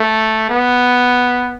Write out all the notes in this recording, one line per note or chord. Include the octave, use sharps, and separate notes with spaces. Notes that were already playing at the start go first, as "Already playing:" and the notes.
Already playing: A3
B3